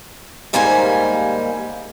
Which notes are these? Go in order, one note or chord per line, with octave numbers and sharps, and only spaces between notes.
D#2 G#2 G3 A#3 C5 G#5